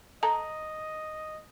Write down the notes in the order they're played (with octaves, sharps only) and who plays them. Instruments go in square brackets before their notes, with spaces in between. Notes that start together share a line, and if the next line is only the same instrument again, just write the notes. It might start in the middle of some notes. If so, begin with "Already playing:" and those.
[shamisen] A4 [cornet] D#5 [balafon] A#5